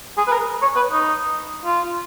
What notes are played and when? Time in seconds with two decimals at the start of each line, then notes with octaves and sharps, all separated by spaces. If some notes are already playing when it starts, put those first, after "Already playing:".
0.18 G#4
0.28 B4
0.32 A#4
0.62 C#5
0.76 B4
0.92 D#4
1.65 F4